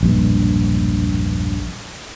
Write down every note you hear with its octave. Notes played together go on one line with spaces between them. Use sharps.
E1 A#1 G2